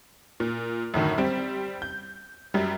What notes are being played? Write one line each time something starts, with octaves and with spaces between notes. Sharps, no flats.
A#2
F#2 A2 D3 D#3
G3 C4
G6
F#2 G3